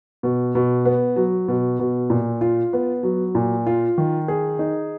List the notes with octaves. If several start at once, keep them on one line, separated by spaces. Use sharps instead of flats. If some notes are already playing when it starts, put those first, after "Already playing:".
B2
B2
B3
F#3
B2
B2
A#2
F4
B3
F#3
A#2
F4
D#3
G#4
D#4